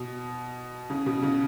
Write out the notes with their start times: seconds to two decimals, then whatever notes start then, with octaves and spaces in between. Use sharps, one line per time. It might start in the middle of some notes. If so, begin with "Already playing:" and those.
Already playing: B2
0.90 C#3
1.06 B2
1.23 C#3